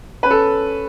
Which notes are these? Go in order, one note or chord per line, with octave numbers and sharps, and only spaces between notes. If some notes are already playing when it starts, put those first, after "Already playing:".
C#4 B4
A4